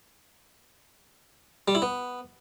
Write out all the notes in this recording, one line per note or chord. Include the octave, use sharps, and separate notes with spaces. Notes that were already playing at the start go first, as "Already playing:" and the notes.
G3
E4
B3